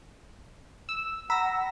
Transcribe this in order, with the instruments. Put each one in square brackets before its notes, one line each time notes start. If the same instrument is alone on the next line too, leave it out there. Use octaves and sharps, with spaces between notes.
[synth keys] E6
[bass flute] F#5 [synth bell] A#5 B5 B6 [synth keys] E6 A#6